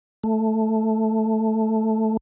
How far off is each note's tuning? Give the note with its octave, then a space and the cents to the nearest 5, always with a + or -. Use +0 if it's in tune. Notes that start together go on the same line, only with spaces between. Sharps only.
A3 +0